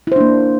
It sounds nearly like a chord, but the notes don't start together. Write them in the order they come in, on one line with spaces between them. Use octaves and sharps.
E4 C5 D4 A#3